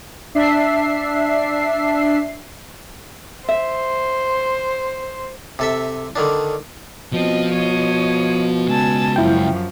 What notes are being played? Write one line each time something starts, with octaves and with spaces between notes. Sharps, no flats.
D4 E5 C7
C5 E5
C3 A4 E5
D3 D#3 D4
B2 F3 C4 D#5
C#5 D#5 D#6
C#3 G#3 G#5 A5 E6
F#2 F3 E4 G5